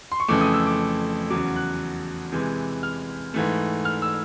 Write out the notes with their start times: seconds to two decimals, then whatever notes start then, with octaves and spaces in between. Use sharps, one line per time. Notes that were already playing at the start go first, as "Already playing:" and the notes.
0.12 C6
0.20 C#6
0.28 F2 C#3 E3 A3 D6
0.41 D#6
0.54 E6
0.67 D6
1.30 E2 C#3 F#3 D6
1.56 F#6
2.32 C3 E3 G#3
2.83 F6
3.34 G#2 E3 A3
3.85 F6
4.02 E6